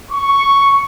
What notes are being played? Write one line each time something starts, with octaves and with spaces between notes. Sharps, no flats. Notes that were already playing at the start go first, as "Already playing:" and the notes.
C#6